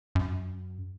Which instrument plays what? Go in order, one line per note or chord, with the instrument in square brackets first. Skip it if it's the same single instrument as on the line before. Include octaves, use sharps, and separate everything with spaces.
[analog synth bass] F#2